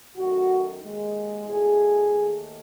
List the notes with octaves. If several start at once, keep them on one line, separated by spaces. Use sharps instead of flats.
F#2 D#3 A3 F#4
D#2 D#3 G#3
E2 B2 A3 G#4
D#2 D#3 A3